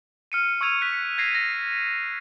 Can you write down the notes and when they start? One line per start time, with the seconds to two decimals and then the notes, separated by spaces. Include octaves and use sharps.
0.32 F6 C#7 D#7
0.61 C#6 E6 F6 G#6 D#7 F7
0.81 F#6 B6 C#7
1.18 G#6 A#6 C7 D#7
1.35 A#6